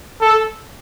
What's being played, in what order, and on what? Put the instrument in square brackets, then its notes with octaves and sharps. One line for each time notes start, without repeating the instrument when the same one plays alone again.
[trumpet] A4